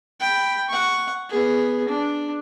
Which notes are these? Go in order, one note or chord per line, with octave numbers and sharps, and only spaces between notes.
G5 B5
F#5 C#6
B3 G#4
D4